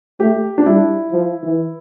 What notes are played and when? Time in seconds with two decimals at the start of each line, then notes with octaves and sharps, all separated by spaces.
0.20 A3 G4
0.58 D4
0.66 G3 E4
1.12 F3
1.43 E3